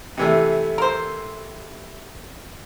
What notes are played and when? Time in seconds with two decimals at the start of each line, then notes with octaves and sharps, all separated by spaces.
0.17 C3 E3 A3
0.78 A#4 C5